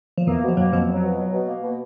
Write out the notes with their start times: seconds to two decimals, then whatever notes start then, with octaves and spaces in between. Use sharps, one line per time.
0.18 F3
0.27 E2 E3 A#3
0.43 B2
0.48 F3
0.57 F#2 F#3 A#3
0.72 F2 B2 F3
0.88 F#3
1.03 B2
1.17 F#3
1.32 B2
1.48 A#3
1.63 B2